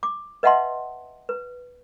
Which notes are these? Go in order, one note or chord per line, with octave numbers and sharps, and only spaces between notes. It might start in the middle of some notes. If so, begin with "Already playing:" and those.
D6
B4 D#5 E5 F#5 A5 C6
B4